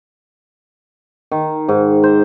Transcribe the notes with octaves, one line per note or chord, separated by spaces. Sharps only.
D#3
G#2
C5